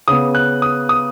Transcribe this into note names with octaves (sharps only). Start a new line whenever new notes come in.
C#3 B3 D#6
F#6
D#6
D#6